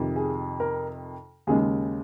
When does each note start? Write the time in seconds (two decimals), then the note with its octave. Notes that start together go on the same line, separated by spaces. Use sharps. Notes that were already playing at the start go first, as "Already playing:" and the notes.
Already playing: F2 C3 D#3
0.16 G#4
0.60 A#4
1.47 D#2 C#3 G#3 G#4